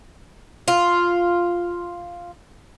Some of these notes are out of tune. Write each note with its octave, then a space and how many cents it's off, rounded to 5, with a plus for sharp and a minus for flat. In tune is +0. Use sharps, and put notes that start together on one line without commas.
F4 +0